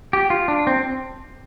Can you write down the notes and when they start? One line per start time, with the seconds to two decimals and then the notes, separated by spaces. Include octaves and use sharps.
0.13 G4
0.30 F4
0.48 D4
0.67 C4